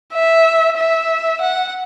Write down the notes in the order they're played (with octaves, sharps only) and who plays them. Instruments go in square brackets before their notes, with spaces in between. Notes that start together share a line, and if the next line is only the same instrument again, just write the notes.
[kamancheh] E5
E5
F#5